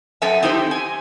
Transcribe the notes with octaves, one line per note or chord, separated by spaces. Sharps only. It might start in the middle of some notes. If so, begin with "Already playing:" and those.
F#2 C4 A4 E5 G#5
C4 D#4 E4 G4 C5
G#5